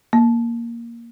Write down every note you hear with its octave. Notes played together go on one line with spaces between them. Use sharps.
A#3